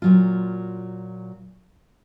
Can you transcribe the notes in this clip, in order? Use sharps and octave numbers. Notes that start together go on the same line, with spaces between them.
A#2 F#3 F4